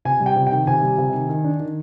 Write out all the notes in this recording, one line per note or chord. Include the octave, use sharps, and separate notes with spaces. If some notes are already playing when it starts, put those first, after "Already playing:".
C3 G#5
G3
G5
C3
D#3 G5
C3 G#5
G3
C3
D#3
D#3
D4
D#3